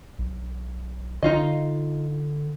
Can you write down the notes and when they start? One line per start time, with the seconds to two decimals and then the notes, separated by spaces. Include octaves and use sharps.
0.19 B1
1.22 D3 D#4 F4 D#5